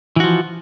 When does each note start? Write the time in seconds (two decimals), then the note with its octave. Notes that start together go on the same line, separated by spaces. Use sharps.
0.16 E3
0.20 F#4
0.24 F3